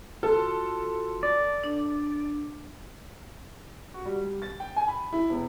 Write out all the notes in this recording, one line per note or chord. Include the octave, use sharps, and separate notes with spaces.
F4 F#4 A4 C6
D5
D4
F#4
G3
G3
A6
G5
G#5
B5
E4
E1